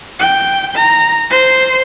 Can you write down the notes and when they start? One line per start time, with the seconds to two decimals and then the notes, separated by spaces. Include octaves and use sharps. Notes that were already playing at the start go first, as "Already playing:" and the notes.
0.19 G5
0.75 A#5
1.30 C5